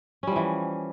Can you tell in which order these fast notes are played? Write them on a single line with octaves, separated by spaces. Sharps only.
C#4 G3 F3 E3